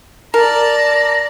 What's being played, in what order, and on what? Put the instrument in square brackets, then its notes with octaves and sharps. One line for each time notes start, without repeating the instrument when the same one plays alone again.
[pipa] A#4 [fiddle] D5 A5 [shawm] A#5